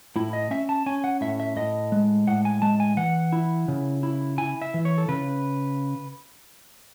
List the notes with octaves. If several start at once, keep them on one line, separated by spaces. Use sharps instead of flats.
A2 E4
D#5
C#4 E5
A5
C#4 G#5
F#5
A2 E5
E5
A2 D#5
G#3
A2 F#5
G#5
G#3 A5
G#5
E3 F#5
E4
C#3
E4
E4 G#5
E5
E3
C#5
A4
C#3 B4